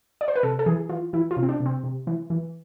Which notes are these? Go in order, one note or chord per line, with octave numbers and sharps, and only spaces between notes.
D5
C5
B4
C3 A4
A4
E3 G#4
E3 F4
E3 E4
F4
C3
C4
D4
C3
C4
C3
E3
E3